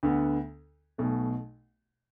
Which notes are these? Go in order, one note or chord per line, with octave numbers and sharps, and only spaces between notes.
D2 D3 B3
B1 B2 A3